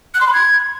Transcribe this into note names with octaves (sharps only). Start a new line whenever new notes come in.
F#6
C6
B5
G#6